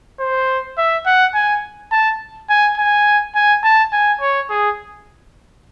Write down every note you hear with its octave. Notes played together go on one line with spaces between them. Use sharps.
C5
E5
F#5
G#5
A5
G#5
G#5
G#5
A5
G#5
C#5
G#4